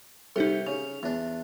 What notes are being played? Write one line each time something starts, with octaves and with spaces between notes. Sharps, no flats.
C2 D#4 G4 A4
C#3 F7
E2 D4